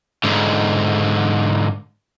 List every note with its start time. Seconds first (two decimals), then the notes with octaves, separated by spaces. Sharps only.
0.24 G#2 D3